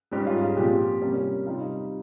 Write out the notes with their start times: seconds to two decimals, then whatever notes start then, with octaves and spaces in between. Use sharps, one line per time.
0.11 G#2 G3 C#4 G4
0.27 F4
0.41 G#4
0.57 A#2 F3 C4 G4
1.02 C3 G3 A#3 C#4
1.46 C3 G3 C4 D#4 F4